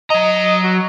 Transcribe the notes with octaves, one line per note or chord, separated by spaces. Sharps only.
F#3 D#5 A#5
F#4